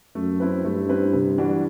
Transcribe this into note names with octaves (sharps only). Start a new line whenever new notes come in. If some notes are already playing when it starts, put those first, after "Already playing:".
F#2 A3
C4 E4 B4
G2 A3
C4 E4 B4
C3
E3 G3 D4 F#4